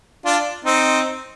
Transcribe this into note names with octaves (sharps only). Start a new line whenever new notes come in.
D4 F4
C4 D#4